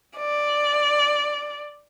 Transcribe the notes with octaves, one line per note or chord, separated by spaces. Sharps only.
D5